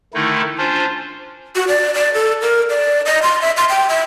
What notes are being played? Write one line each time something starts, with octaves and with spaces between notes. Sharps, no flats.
D3 D#3 A3 D#4 E4
C#4 D4 F4 C5
F#4
D5
D5
A4
A#4
D5
D#5
C6
E5
C6
G5
E5